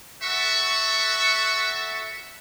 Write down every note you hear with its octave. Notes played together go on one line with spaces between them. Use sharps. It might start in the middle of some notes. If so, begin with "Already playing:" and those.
F#4 A4 E5 F#5 C#6